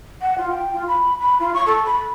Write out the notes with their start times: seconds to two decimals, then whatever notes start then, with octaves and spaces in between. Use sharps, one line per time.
0.21 F#5
0.38 F4
0.51 G5
0.73 F4
0.88 B5
1.20 B5
1.40 F4
1.54 C#6
1.66 A4
1.86 B5